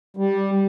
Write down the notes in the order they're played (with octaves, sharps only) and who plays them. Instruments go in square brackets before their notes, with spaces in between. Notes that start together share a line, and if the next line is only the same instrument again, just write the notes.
[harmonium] G3